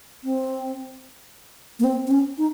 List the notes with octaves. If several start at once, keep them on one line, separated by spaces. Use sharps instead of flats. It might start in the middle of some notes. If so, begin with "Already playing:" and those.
C4
A#3
C4
C4
C#4
D#4